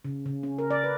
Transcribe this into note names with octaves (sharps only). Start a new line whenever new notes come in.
C#3
C#3
C#4
A#4
D5
B4